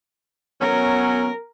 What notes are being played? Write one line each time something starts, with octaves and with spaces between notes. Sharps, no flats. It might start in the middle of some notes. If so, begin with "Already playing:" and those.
F#3 B3 C#4 A#4